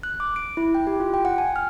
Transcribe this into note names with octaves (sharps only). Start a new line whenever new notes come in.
F#6
D6
D7
E4
G5
G4
F4
G5
F#5
G#5
F6